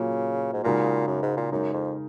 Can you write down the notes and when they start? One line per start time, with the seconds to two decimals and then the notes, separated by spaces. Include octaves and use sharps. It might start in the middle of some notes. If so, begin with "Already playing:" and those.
Already playing: A#2 C#3 F#3 A#3 F4
0.53 G#2
0.64 A#2 C#3 G#3 D#4 F#4 A#4
1.08 F#2
1.23 G#2
1.37 A#2
1.51 F#2 C#3 G#3 D#4 A#4
1.73 F2